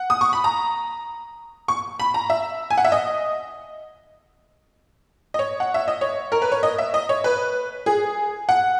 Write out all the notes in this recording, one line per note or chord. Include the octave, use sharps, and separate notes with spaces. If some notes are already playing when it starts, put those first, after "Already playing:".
Already playing: F#5
D#6
C#6
B5
A#5
C#6
B5
A#5
E5
G#5
F#5
E5
D#5
D#5
C#5
F#5
E5
D#5
C#5
A#4
B4
C#5
D#5
E5
D#5
C#5
B4
G#4
F#5